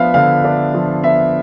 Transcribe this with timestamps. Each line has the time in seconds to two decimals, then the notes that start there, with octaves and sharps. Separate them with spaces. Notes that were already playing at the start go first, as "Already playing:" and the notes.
Already playing: F3 B3 D4 E5 F5
0.14 D3 F5
0.44 D4
0.74 F3
1.04 B3 E5